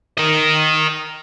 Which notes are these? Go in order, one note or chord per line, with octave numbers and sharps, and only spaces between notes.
A#4 D#5